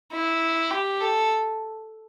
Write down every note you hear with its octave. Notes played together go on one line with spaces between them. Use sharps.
E4
G4
A4